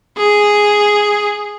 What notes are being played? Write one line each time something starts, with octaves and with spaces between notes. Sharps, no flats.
G#4